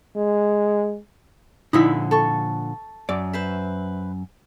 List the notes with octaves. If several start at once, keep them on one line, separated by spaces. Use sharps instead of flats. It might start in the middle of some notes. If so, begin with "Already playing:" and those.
G#3
A#2 D3 F3 D#4 E4 B5
A4 C#6
F#2 D5
B4 C5 E5